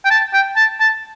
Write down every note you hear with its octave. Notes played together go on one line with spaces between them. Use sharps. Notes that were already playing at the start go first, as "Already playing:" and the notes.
G5
A5
G5
A5
A5